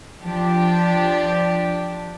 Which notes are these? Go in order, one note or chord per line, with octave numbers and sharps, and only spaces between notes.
F3 D4 G4